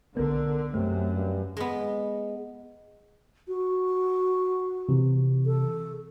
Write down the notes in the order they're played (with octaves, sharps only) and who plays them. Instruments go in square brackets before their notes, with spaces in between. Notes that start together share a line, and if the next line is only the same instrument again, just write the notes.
[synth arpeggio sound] B1 B3 [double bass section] D3 [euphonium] A#4
[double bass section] F#2 [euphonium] C3 [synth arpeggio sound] A3
[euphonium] G2
[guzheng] G#3 B3
[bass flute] F#4
[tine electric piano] C3 E3
[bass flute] A4